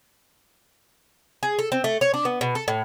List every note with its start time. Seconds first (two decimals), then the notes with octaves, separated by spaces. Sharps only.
1.43 G#4
1.59 A4
1.72 C4
1.84 A3
2.01 C#5
2.14 D4
2.25 B3
2.41 B2
2.55 A4
2.68 A2